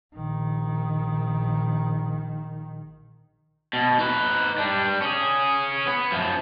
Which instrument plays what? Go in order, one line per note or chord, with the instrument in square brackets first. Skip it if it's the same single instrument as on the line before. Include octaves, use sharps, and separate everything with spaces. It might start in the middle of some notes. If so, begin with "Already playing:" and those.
[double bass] A#1 D#3
[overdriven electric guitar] B2
D#4 B4
G3 D4
C#4 G#4
B3
F#2 F3